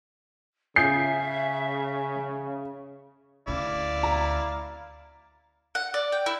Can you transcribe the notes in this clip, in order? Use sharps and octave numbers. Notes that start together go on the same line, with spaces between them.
C#3 E5 G#5 D#6 G6 C7
D2 C#4 E4 D5 F5
A#5
F#5
D5
G5
E4